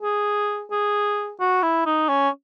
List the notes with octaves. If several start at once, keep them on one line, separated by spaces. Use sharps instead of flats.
G#4
G#4
F#4
E4
D#4
C#4